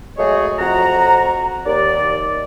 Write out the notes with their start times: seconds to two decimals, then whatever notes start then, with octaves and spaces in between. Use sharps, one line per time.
0.18 F#3 G#3 A3 G#4 C#5 D#5
0.59 F2 F#4 A#5
1.65 D#2 D5